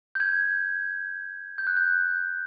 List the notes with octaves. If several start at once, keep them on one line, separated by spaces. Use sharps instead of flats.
G6
G#6
G6
F#6
G6